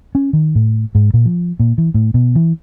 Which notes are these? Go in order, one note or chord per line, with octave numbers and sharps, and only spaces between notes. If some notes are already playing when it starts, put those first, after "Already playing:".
C#4
D#3
A2
G#2
A#2
F3
A#2
E3
A2
B2
E3